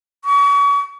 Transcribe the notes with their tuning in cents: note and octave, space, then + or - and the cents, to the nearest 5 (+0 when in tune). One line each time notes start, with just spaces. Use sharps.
C#6 +40